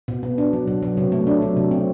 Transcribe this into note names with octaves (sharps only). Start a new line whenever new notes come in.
B2
B3
D4
F#3
B2
F#3
C3
A3
D4
F#3
C3
C4